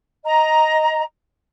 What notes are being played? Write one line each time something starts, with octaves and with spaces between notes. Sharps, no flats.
D#5 A#5